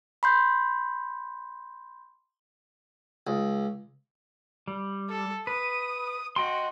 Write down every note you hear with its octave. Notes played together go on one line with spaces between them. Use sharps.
B5 C6 G6
C#2
G3
A4
B4 D#6
F#4 D#5 G5 C6